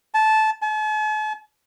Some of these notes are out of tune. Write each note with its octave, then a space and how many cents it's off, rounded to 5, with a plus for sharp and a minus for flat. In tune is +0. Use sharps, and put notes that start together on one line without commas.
A5 -15
A5 -45